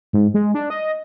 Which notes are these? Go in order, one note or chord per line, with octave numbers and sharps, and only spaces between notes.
G#2
G#3
D4
D#5